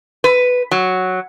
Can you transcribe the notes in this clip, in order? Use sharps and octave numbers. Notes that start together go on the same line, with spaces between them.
B4
F#3